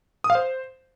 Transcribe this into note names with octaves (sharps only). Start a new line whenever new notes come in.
D#6
F5
C5